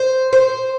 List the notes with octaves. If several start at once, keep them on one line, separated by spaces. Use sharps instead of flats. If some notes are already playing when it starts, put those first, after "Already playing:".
Already playing: C5
C5